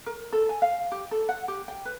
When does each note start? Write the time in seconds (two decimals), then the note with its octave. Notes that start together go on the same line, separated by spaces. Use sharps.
0.06 A#4
0.33 A4
0.49 G#5
0.62 F5
0.92 G4
1.11 A4
1.29 F#5
1.48 G4
1.68 G5
1.85 B4